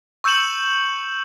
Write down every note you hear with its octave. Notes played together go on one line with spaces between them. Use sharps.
C#6 E6 G6 C#7 E7 F#7